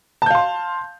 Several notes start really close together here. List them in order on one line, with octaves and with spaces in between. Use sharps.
A5 G6 F5 C6